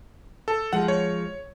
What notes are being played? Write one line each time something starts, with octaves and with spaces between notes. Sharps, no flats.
A4
F3 G#3 F#5
C#5